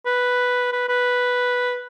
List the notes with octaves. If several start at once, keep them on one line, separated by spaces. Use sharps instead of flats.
B4
B4
B4